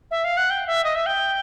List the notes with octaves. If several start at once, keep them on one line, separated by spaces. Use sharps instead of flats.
E5
F5
F#5
G5
E5
D#5
E5
G5